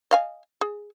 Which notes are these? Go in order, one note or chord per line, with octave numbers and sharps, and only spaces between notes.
D#5 F5 G#5
G#4